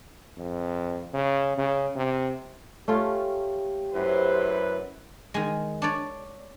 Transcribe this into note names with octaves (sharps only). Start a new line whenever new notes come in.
F2
C#3
C#3
C3
A3 C#4 F4 G4
F#2 E4 B4 C5
D#3 G#3
D4 C#5 D5